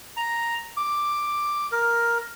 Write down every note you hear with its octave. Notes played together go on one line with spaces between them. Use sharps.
A#5
D6
A#4